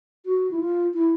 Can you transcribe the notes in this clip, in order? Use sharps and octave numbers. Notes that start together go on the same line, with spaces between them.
F#4
E4
F4
E4